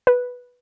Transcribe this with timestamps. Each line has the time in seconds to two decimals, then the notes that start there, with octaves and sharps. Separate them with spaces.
0.07 B4